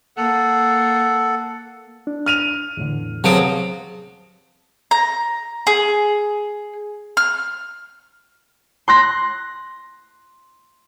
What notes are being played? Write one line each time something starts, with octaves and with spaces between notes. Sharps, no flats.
A#3 A4 F#5
D4
F6 D#7 F7
E2 A2 D3
C3 F#3 B3 G#4 C5 F5 A5 D7
A#5
G#4
F6
C6 F#6 A#6